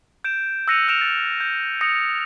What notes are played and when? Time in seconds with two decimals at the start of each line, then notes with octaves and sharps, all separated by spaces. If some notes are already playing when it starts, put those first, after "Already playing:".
0.24 G6 D7 E7
0.68 E6 F#6 A#6 C#7 D#7 F7
0.88 E6 F6 D7 E7 F7
1.01 A6
1.40 G6
1.81 D#6 A#6 C#7